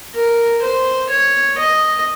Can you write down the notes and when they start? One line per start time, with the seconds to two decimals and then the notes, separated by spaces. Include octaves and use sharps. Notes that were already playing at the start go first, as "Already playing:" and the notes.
0.15 A#4
0.62 C5
1.10 C#5
1.58 D#5